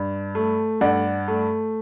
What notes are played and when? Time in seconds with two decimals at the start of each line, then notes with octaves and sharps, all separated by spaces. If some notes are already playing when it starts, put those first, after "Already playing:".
Already playing: G2
0.35 A3
0.81 G2 D5 F#5
1.28 A3